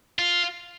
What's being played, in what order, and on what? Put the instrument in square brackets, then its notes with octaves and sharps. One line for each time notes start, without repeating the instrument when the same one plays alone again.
[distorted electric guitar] F4